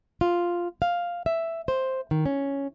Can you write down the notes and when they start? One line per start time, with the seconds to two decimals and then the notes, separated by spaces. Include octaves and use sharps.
0.21 F4
0.82 F5
1.26 E5
1.68 C5
2.11 D#3
2.26 C#4